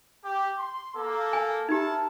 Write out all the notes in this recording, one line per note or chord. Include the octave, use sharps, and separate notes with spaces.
G4
C6
A#3 A4
G#5
D#4 E4 G4 A#4 A5